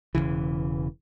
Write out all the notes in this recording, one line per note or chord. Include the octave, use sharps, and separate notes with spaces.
E1 B1 C#3 E3